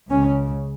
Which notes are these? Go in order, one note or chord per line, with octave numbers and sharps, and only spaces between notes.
C#2 C#3 C#4